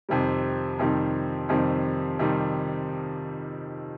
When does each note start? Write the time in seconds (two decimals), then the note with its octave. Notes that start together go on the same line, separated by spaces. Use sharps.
0.09 F2 C3 D#3 G3
0.79 F2 C3 D#3 G3
1.49 F2 C3 D#3 G3
2.19 C3 D#3 G3